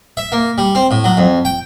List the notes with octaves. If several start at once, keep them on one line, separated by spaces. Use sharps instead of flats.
E5
A#3
G3
C4
A2
F#3
F2
G5